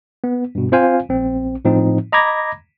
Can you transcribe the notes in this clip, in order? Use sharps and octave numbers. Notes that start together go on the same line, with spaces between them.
B3
G2 B2
C4 F4 C5 F5 G#5
A#1 C4
A2 F3 C4 D#4
D#5 A#5 B5 D6 G#6 A#6